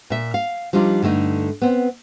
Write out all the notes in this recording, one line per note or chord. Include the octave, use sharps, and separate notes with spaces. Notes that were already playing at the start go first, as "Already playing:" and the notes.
A#2 E5
F5
F3 G3 D4 D#4 F4
G2 D3 A3 D#4
B3 C4